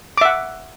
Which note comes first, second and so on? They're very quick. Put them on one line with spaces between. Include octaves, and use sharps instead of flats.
D6 E5 F#5